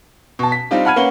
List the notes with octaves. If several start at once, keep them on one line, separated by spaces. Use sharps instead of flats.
B2 A5
B6
G3 C4 D4 D#4 F4 G4
F#5 A5 B5 F6 G#6 D#7
A#3 C#4 B4 F#5 G7